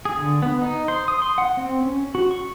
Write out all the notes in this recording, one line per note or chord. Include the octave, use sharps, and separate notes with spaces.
G#4
D3
B3
D#4
C5
D#6
C6
F#5
C4
C#4
F#4
C#6